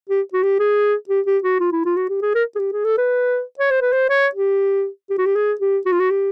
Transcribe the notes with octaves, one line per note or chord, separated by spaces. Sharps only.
G4
F#4
G4
G#4
G4
G4
F#4
F4
E4
F4
F#4
G4
G#4
A#4
G#4
G4
G#4
A4
B4
C#5
C5
B4
C5
C#5
G4
G4
F#4
G4
G#4
G4
F#4
F4
F#4
G4